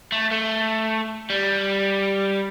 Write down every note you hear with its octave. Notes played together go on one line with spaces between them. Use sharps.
A3
A3
G3